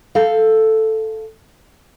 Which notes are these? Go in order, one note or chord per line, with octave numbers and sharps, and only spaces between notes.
A4 F5